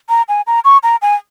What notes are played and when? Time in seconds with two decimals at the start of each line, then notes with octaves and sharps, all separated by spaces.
0.09 A#5
0.29 G#5
0.47 A#5
0.65 C#6
0.83 A#5
1.02 G#5